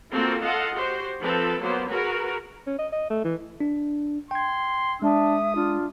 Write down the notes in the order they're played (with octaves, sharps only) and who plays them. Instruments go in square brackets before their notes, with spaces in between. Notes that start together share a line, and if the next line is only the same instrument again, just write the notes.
[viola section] A#3 C4 F4 F#4 A4
F4 A4 D#5 F5 F#5 C6
F#4 G4 C5
F3 C4 A4 B4
F#3 A#3 B3 C5
F#4 G#4 A#4 B4
[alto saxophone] C#4
D#5
D#5
A3
E3
[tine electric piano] D4
[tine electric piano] G5 G#6 [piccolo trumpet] C6
[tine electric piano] G#3 [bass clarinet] D4 [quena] E5 [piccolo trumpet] D#6
[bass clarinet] D4 [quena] F4